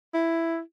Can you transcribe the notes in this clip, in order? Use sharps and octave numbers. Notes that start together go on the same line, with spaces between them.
E4